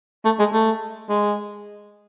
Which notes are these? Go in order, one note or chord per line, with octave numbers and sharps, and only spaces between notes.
A3
G#3
A3
G#3